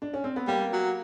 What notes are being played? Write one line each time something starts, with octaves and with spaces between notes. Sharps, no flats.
D4
C#4
C4
B3
G3 A#3
F#3